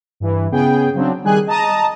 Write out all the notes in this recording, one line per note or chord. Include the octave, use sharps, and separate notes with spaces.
G2 E3
C#3 B3 G#4 G5
C#3 F#3 C4 D4
D#3 G3 G#4 G#5 F#6
D#5 A5 A#5 D#6